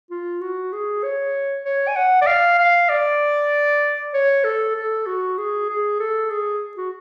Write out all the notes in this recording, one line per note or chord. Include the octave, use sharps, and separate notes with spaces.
F4
F#4
G#4
C#5
C#5
G#5
F#5
D5
F5
F5
D5
C#5
A4
A4
F#4
G#4
G#4
A4
G#4
F#4